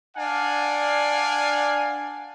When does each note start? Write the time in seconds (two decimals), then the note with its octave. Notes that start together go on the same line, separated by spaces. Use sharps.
0.16 D4 D5 F5 F#5 G#5